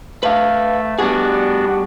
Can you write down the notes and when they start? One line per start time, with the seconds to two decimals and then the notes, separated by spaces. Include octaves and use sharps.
0.23 A3 B4 F5
0.99 G3 B3 D4 F#4 G#4